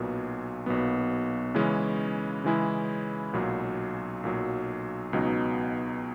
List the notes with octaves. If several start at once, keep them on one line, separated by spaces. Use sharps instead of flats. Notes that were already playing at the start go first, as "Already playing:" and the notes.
Already playing: B1 A#2 F#3 B3
B1 A#2 F#3 B3
C#3 E3 G#3 C#4 E4
C#3 E3 G#3 C#4 E4
B1 A#2 F#3
B1 A#2 F#3
C#2 B2 F#3 B3 D#4